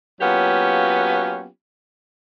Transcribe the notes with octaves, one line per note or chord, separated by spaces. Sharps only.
F#3 A#3 B3 C#4 F4 G4